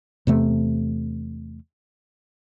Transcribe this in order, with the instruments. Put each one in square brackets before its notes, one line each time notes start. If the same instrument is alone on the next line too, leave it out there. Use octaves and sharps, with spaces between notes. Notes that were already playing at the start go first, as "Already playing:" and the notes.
[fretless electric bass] E2 C3 A3